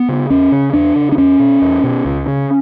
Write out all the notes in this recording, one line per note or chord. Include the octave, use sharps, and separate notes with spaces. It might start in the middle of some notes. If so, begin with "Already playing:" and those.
Already playing: B3
C#3
E2 C#4
C#3
E2 D4
C#3
D4
E2 C#4
B2
E2
B2
C#2
C#3